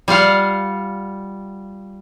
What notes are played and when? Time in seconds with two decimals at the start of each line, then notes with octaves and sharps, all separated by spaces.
0.08 G3 F4 F5 F#5